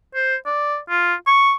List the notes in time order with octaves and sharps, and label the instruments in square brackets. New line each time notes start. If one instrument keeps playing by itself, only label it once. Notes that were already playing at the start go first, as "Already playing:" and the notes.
[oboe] C5
D5
F4
C#6